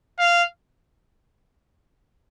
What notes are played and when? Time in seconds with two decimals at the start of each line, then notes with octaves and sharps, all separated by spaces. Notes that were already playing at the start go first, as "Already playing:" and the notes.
0.19 F5